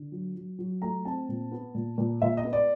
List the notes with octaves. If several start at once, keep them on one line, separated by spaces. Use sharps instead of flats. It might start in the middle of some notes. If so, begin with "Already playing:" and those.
Already playing: D3
F#3
F#3
F#3
A3 A#5
C4 A5
A#2
B3
A#2
A#2
A#2 E5
D#5
B3
D5